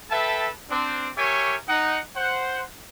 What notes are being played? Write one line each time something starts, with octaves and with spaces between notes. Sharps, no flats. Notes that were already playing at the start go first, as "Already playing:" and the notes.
A4 B4 E5 G5 A5
C4 D4
G4 A#4 C#5 E5 G#5 C#6
D#4 F#5
C5 F#5